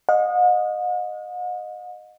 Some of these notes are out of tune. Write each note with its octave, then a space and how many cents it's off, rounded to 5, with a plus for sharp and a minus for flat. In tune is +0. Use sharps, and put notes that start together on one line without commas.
D#5 -10 F#5 -45